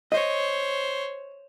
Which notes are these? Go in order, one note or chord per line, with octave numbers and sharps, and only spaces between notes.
C5 C#5 D#5